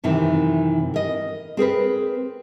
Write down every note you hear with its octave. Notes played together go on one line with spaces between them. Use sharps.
F#2 C3 D#3 E3
A#4 D#5
C4 G#4 A#4 B4